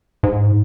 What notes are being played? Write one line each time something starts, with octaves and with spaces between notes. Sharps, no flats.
G#2